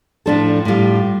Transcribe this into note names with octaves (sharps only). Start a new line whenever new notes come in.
A2 F3 D4 A4
A2 G3 F4